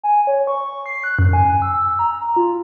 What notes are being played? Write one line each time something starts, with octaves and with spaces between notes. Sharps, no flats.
G#5
C#5
C#6
C7
F#6
F#2
G#5
E6
A#5
F4